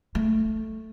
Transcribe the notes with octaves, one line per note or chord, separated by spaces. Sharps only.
A3